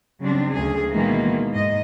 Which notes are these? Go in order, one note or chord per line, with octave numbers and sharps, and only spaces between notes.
C#3 F#3 G3 C4 D4
D2 G#4
B2 D#3 E3 G#3 A#3
G#2 D#5